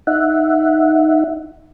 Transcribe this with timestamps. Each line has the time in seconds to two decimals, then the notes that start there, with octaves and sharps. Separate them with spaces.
0.07 D#4 E5 F#5